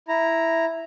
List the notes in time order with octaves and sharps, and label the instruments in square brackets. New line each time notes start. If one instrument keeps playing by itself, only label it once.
[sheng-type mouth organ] E4 A#5